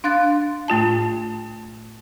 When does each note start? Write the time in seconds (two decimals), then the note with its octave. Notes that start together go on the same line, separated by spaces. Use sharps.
0.04 D4 F5 F#6 A6
0.68 A2 A3 F4 A5